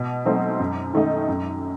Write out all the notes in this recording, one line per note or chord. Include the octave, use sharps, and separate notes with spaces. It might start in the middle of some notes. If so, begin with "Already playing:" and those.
Already playing: B2
F#3 A3 C4 D#4
F#2
D#3 A3 D#4
F#2